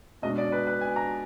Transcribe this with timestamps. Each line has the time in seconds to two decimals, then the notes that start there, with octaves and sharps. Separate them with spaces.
0.22 B2 G#3 D4 D#5
0.38 D5
0.52 B4
0.67 B4
0.81 G#5
0.96 A#5